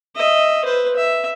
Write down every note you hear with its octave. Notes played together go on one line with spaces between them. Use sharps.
D#5 E5
B4 C5
E5